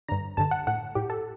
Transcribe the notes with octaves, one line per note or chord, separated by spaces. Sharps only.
G2 D3 A#5
G2 D3 A5
F#5
A2 F#5
A2 G4
A4